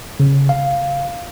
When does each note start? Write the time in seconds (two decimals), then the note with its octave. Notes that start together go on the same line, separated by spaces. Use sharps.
0.20 C#3
0.49 F5